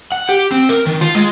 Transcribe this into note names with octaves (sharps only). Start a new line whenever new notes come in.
F#5
G4
C4
A#4
D#3
F4
G#3